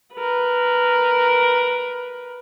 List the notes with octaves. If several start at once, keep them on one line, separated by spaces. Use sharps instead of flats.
A#4 B4